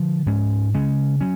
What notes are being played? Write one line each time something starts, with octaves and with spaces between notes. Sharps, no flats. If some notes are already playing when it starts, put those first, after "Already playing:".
Already playing: D3 F3
G#2 G#3 C#4
C#3 G#3 C#4
F#3 C#4